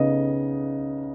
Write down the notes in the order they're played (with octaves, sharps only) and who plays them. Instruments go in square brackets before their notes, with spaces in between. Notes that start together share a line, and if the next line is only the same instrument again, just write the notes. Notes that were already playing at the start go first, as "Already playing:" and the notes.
Already playing: [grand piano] C#3 B3 D#4 D#5